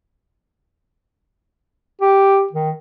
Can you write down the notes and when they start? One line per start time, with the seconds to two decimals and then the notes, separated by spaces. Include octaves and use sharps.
2.01 G4
2.53 D#3